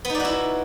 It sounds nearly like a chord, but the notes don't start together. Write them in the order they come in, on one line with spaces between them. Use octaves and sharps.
B3 D#4 D5 F#4 E4